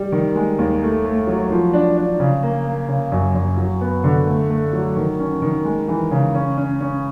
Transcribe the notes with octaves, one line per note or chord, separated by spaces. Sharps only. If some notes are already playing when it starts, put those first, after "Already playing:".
Already playing: G3
D#3
G#3
D#2
A3
A3
F#3
F3
D4
D4
C#3
A#3
A#3
C#3
F#2
F#2
F#3
B3
D3
A3
A3
F#3
D#3
C#4
D#3
G#3
E3
C#3
C#4
C#4
C#4